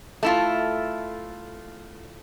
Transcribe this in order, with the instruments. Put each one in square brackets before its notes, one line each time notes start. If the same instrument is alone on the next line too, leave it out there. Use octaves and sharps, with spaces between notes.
[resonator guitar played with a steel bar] A3 E4 F4